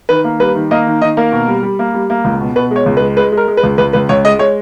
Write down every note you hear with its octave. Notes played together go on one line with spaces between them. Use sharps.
D#3 B4
A#3
G3 B4
D#3
A#3 D#5
D#3
D#3 D#5
A#3 A#4
B2
G3
G3
A#3
G3
A#3
C#2
B2
B2 B4
G#3
C#5
C#2
B4
G#3
G#3 B4
G#3
A#4
G#3
B4
C#2
C#2 B4
C#2 B4
C#2 C#5
G#3 D#5
G#3 C#5